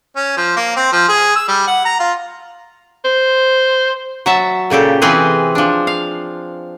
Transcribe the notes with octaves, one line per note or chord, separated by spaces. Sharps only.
C#4
F3
A#3
C4
F3
G#4
E6
G3
F#5
A#5
F4
C5
F#3 E5 A5
A#2 C#3 G4 A4
C3 E3 C4 G#4 B4
F3 D4
F5